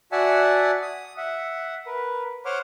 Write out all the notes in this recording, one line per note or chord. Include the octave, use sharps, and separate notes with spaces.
F#4 D5 E5 F#5 G#5 A5
D#6
E5 F#5
A#4 B4
C5 C#5 F#5 C6 D6 F6